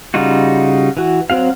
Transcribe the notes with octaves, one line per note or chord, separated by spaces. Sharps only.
C#3 G3 D#4 F4 F#4
E3 F#4
F#3 C4 F#4 F5